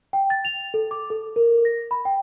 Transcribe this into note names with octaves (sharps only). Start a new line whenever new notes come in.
G5
A6
F7
A4
D6
A4
A#4
A#6
B5
G5